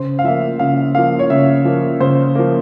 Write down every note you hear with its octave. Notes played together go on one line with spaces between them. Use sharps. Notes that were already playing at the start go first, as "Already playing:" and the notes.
Already playing: C#3 C5
F5
F3 A#3 E5
C#3 F5
F3 A#3 F5
C#5
C#3 E5
F3 A#3
C#3 C5
F3 A#3